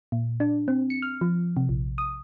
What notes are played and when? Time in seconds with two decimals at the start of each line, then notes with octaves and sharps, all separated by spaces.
0.12 A#2
0.40 D4
0.68 C4
0.90 C#7
1.02 F6
1.21 F3
1.57 C3
1.69 A#1
1.98 D#6